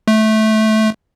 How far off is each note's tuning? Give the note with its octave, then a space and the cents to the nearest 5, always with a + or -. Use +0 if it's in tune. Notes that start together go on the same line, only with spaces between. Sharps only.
A3 -15